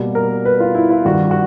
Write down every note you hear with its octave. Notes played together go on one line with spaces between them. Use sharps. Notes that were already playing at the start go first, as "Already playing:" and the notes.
Already playing: B2 G3 A#3
A#4
B4
F4
E4
F4
G2 D#3 G3 F#4
F#4